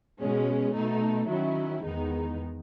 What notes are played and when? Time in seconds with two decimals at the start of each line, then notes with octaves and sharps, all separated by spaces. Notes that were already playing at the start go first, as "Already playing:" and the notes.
0.20 B2 G#3 C#4
0.74 B2 A3 D#4
1.29 D#3 F#3 C#4 E4
1.84 E2 D#3 G#3 B3 D#4